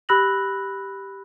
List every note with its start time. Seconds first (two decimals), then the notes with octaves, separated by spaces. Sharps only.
0.09 G4 B5 E6 F#6 A#6 F#7